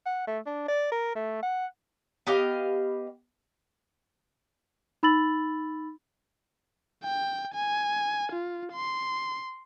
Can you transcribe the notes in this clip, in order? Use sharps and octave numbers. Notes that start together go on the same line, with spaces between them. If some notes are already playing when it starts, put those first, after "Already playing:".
F#5
A3
D4
D5
A#4
A3
F#5
B3 G4 D#5 F5
D#4 B5 E6 A6 F#7
G5
G#5
F4
C6